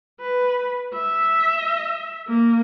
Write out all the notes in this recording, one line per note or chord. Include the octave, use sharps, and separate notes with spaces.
B4
E5
A#3